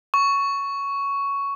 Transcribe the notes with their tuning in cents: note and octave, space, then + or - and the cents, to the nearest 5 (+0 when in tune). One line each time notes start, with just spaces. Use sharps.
C#6 +10